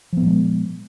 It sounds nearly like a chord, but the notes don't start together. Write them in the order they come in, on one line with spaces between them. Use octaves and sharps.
F3 B3 A#2 G#3